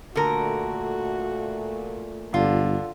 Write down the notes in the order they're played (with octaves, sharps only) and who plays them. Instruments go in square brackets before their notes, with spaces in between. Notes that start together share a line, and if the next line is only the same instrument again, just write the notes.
[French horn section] A#2 A3 [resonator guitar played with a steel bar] D3 A#4 [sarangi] F#4
[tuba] G1 [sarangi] D3 [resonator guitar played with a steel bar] F4